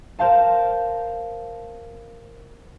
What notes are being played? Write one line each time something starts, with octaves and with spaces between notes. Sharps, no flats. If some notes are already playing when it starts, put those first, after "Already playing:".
A#4 C5 F5 A5